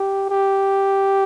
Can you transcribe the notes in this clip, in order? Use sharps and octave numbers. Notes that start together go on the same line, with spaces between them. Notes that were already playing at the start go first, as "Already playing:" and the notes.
Already playing: G4
G4